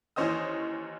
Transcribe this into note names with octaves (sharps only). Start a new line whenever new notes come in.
D#2 E3 C#4 C5 D#5 D#6